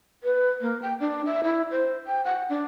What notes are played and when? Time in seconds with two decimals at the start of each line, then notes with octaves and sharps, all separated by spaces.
0.23 B4
0.61 A#3
0.82 G5
1.00 D4
1.26 E5
1.44 E4
1.71 C5
2.07 G5
2.25 F#5
2.49 D4